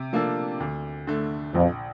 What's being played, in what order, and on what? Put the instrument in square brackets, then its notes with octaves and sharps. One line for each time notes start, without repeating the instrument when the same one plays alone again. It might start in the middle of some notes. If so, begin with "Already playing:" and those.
Already playing: [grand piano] C3
F3 A#3 D4 A4
D2
D3 A3
[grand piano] A#1 [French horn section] F2